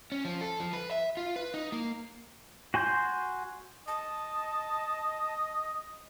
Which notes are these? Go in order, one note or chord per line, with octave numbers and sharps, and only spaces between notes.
C#4
F3
A4
F3
B4
E5
F4
B4
D#4
A#3
F#4 G#5 C6 G6
D#5 A5